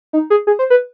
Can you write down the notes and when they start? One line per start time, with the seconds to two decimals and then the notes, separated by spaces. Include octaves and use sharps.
0.13 D#4
0.30 G#4
0.47 G#4
0.59 C5
0.70 B4